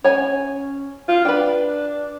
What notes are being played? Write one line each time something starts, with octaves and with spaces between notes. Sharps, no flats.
C#4 C#5 G#5
F4
D4 B4 G5